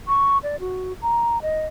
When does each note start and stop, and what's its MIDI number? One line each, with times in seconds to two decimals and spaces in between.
0.08 0.38 85
0.43 0.56 74
0.60 0.93 66
1.02 1.41 82
1.42 1.66 75